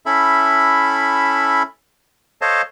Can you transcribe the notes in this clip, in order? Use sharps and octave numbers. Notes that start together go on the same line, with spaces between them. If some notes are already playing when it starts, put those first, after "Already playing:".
C#4 E4 A4 E5 B5
A4 C5 C#5 D#5 F5 A5